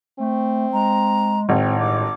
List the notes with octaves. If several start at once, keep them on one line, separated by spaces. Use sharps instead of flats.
A3 C4
G#3 A#5
G#1 A2 C4
G2 D6